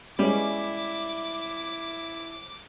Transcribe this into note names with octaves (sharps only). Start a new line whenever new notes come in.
G3 G#3 B3 C#4 E4 D6